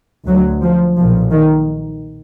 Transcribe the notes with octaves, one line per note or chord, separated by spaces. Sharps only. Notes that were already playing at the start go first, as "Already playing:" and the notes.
D2 F#3
F3
B1 A#2 F3
D#3